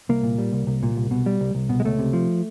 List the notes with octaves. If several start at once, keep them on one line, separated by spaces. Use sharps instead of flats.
C2 A#3
A#2
G3
C2
C2
A#2
C2
B2
G3
C2
C2
B2
G#3
C#2 A3
C3
F3